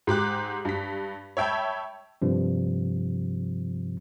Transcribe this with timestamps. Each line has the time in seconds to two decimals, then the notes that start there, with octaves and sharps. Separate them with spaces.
0.07 G#2 G4 D6 F#6
0.65 G2 B6
1.37 C#5 E5 G5 A5 B5
2.22 G2 C3 F3